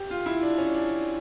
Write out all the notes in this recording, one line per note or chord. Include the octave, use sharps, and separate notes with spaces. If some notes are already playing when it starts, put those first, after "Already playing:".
Already playing: G4
F4
E4
D4
C#4
D4